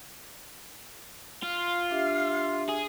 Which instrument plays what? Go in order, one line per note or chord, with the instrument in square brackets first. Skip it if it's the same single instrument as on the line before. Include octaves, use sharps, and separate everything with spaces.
[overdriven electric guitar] F4 [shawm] F5
[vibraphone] D4 G4 E5
[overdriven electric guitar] G#4